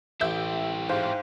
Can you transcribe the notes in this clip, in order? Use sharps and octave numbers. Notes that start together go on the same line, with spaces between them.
A1 E4 G4 E5 G6
G#2 C5 F5 G5